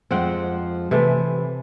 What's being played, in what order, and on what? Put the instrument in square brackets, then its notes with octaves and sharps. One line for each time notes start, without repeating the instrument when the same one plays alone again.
[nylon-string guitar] F2 F3 G#3 [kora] C4 F#5 G5
[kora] C3 A3 [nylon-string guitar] E3 G#5